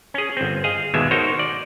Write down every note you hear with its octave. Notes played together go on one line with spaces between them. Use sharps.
C#4 G#4
G1 C4
G#4 D#5 F5
G#1 D#2 B2 G#3 E5
D#4 F#4 A#4 C5 C#5
D5